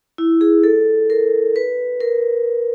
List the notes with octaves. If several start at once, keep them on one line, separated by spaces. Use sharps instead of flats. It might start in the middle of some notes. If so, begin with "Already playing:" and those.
E4
G#4
A4
A#4
B4
A#4